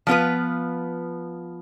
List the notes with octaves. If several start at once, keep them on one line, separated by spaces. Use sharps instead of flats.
F3 B3 F4 B4